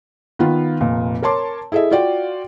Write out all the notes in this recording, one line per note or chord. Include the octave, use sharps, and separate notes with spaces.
D#3 B3 F4
F1 A#2
A#4 C#5 A5 C6 D6
E4 G#4 A4 D#5 E5
F4 F#4 D5 G5